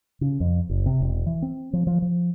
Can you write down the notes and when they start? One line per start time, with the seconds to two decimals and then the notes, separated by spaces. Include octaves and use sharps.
0.21 C#3
0.40 F2
0.69 F#1
0.86 C3
1.01 E1
1.26 E3
1.42 C4
1.73 F3
1.87 F3
2.02 F3